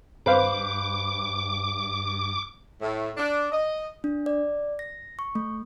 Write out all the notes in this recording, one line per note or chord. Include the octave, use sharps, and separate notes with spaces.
G2 B4 C5 F5 D6
A2
D4
D#5
D4
D5
A#6
C#6
A3